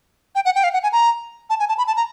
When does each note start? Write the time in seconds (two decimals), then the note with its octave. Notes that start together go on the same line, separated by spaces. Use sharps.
0.35 G5
0.45 F#5
0.55 G5
0.64 F5
0.73 F#5
0.83 G#5
0.92 A#5
1.50 A5
1.59 G#5
1.69 A5
1.78 B5
1.87 A5
1.96 A#5